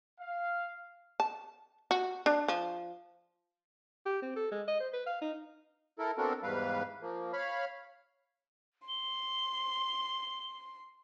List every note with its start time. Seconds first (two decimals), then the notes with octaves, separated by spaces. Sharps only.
0.20 F5
1.20 A5
1.91 F#4
2.26 D4
2.48 F3
4.05 G4
4.22 C4
4.36 A4
4.51 G#3
4.68 D#5
4.80 C5
4.93 B4
5.06 F5
5.21 D#4
5.99 E4 A4 A#4
6.18 B3 C4 D4 F#4 A4 A#4
6.43 E2 G#2 G3 B4 F5
7.02 F3 A#3
7.33 C#5 F5 B5 F6
8.88 C6 G7